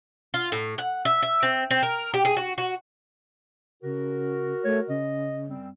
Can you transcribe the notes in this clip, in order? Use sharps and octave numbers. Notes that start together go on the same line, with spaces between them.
F4
A2
F#5
E5
E5
C4
C4
A#4
G4
G#4
F#4
F#4
C#3 F#4 A#4
A3 C#5
C#3 D#5
F#2 G3 C4